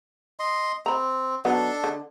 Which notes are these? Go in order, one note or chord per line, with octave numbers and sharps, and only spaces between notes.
D#5 C6
C4 A#5 B5
F#3 B3 D4 D#4 A4
D3